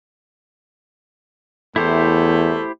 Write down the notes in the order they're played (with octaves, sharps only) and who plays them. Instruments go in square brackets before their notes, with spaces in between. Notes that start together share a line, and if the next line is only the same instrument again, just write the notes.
[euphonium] E2 [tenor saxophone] A3 [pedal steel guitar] E4 G4 C5